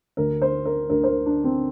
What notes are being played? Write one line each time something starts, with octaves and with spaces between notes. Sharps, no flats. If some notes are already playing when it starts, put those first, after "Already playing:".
D2 D3 A#4
C5
A#4
D2 D3 A#4
C5
A#4
D4
C4